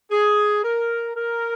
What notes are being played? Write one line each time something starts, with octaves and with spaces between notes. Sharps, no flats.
G#4
A#4
A#4